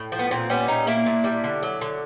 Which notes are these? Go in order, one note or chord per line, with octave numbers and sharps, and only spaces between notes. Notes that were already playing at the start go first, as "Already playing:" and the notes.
Already playing: A2
F3
B3
A#2 C4
G3 B3 C#4
A#2 C#4 D#4
A#3 D4 E4
A#2
G3
D3
F#3
D3